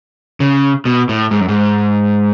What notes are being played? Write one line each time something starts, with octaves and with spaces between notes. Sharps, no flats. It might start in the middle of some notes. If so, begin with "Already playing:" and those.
C#3
B2
A2
G#2
F#2
G#2